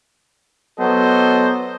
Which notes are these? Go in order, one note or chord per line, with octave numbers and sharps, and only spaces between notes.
F#3 B3 A4 C5 D#5